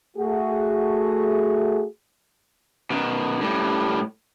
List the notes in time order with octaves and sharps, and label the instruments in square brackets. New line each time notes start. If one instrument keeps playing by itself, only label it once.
[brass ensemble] A3 F#4 G#4
[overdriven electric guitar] B2 D#3
A2 G3